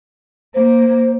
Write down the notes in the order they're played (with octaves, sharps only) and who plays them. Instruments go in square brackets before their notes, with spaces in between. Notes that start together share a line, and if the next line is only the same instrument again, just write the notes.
[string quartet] A#3 [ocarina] C5